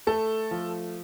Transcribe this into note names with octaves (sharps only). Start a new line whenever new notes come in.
A3 A4
F3